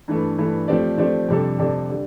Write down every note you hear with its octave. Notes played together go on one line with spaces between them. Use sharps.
G2 E3 A3
G2 E3 A3
F3 A3 C4 G4 D5
F3 A3 C4 G4 D5
F2 C3 G3 D4 A4
F2 C3 G3 D4 A4
D3 G3